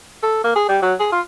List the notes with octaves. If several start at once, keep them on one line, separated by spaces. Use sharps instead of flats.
A4
A#3
G#4
G3
F#3
G#4
F4